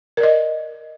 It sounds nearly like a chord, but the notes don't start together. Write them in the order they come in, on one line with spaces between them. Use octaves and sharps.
A#4 D5 D#5